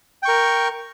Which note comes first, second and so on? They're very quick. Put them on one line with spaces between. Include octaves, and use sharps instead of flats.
G5 C#6 A#4